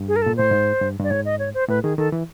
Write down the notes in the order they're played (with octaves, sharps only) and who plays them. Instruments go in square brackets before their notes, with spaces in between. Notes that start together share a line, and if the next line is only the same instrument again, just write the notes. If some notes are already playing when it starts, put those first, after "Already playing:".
Already playing: [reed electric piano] G2
[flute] G#4
A#4
[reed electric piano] A#2 [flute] A4
[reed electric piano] A2 [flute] C5
[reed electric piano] G#2
G2
[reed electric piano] G2 [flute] D5
[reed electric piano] G#2 [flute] C#5
[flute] D#5
C#5
C5
[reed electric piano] A2 [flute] B4
[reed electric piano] D#3 [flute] G#4
[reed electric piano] D#3 [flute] A4
[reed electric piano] E3